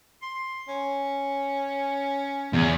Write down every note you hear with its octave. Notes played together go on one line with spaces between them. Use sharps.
C6
C#4
E2